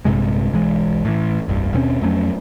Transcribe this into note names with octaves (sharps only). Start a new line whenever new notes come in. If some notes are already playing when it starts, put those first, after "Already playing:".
A#1 G2 C3 G#3
B1 E3 G#3
A2 E3
F1 C2 G2
D#2 B2 C4 C#4
F2 F#3 A3 C#4